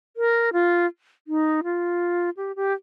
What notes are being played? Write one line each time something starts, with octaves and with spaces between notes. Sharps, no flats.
A#4
F4
D#4
F4
G4
G4